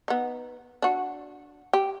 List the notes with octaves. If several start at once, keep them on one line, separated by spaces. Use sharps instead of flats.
B3 D#4
D4 F#4
G4